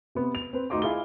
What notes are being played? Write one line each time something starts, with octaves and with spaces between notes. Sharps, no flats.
C3 B3
F7
C4 B4
D2 D#4 F#4 D#5 C6 D6
E4 F4 G#4 G7